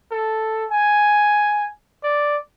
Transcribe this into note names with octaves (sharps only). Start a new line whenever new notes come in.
A4
G#5
D5